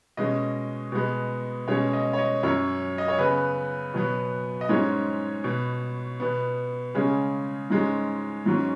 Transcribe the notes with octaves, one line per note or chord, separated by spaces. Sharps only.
B2 G#3 C#4 D#5
B2 G#3 B3
B2 G#3 C#4 C#5
D#5
C#5
D#5
F#2 F#3 C#4 C#5
D#5
C#5
C#3 B3 B4
B2 F#3 B3
D#5
G#2 G#3 C#4 C#5
B2 B3
B2 B3
C#3 G#3 C#4
G#2 G#3 C#4
G#2 F#3 C#4